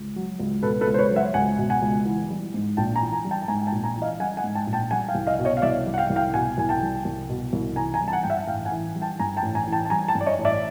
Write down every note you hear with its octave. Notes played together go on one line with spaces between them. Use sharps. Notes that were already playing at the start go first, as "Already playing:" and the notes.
Already playing: C#2
F#3
C#2
B2 A4 B4
A4 B4
C#2
C5
B4 C#5
F#3
E5 F#5
C#2 F#5 G#5
B2
F#5 G#5
C#2
E3
G3
G#2
A#1 G5 A5
G#5 A#5
E3
G#5 A#5
G3
G5 A5
A5
G#2 G#5 A#5
G#5
G5 A5
A#1
G#5 A#5
E3
D#5 F5
G3 F#5 G#5
F#5 G#5
G#2
G5 A5
A#1
G5 A5
G3 F#5 G#5
F5 G5
C2
D#5 F5
B2
C#5 D#5
F5
C2 D5 E5
G3
F#5
F5 G5
C2
F5 G5
B2 F#5 G#5
C2 G#5
G5 A5
G3
C2
B2
C2
E3 G#5 A#5
G#5 A#5
G3
A5
F#5 G#5
G2 G5
E5 F#5
A1 F5 G5
F#5 G#5
E3
G3
G5 A5
G2 G#5 A#5
G5 A5
A1
G#5 A#5
E3
G5 A5
A5
G3 G#5 A#5
G5 A5
G2
D5
C#5 D#5
A1
D5 E5